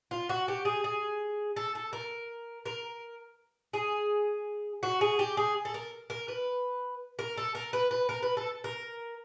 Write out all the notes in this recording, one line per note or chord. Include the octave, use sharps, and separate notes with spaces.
F4
F#4
G4
G#4
G#4
A4
A4
A#4
A#4
G#4
F#4
G#4
G4
G#4
A4
A#4
A#4
B4
A#4
A4
A#4
B4
B4
A#4
B4
A4
A#4